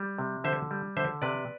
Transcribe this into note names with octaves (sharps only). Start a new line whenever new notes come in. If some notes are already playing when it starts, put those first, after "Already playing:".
Already playing: G3
C3
D3 C5 E5
G3
D3 C5 E5
C3 B4 D5